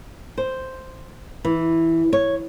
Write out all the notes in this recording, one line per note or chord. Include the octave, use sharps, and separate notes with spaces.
C5
E3
C#5